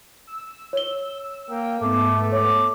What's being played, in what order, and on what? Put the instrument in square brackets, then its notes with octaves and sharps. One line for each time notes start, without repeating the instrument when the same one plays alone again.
[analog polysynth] E6
[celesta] C#5 G7
[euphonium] A#3 [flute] G5
[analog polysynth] G#2 B3 [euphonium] A3 [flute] D6
[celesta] C#5 [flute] D6